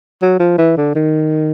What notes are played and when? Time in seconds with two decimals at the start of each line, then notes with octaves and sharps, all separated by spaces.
0.22 F#3
0.40 F3
0.58 E3
0.77 D3
0.95 D#3